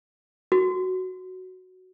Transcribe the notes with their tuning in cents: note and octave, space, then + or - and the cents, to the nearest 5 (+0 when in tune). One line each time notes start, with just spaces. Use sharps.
F#4 +0